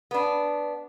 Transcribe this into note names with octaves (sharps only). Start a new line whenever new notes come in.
B3 D4